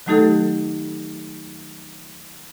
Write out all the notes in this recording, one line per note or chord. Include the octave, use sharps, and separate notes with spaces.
D#3 F#3 A3 D#4 G4 A4